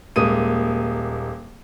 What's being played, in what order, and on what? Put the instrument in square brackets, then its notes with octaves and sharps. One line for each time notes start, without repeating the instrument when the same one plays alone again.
[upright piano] D#1 G#3 A#3 D#6 D#7